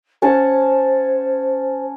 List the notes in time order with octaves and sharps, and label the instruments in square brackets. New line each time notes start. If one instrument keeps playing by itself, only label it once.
[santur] C#4 F#5 A5 [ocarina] C5